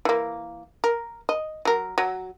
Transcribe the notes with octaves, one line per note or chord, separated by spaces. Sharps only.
E3 A#3
A#4
D#5
F#3 A#4
F#3